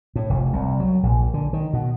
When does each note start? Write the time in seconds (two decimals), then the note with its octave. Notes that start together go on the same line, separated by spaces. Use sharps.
0.16 A2
0.30 F1
0.53 C2
0.80 F#3
1.03 A#1
1.34 D3
1.53 D#3
1.73 B2